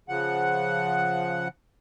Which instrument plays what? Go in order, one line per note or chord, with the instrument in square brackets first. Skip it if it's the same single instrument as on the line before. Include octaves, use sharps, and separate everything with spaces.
[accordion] C#3 F3 F#5